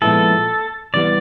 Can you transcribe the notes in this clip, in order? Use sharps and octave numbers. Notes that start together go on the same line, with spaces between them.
A#2 F3 G#3 B3 E4 A4
C2 C3 E3 G3 B3 D5